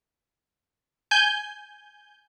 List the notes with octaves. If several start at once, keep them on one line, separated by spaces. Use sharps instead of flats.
G#5 G6